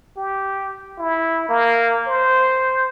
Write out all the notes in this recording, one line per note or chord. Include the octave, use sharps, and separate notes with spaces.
G4
E4
A#3
C5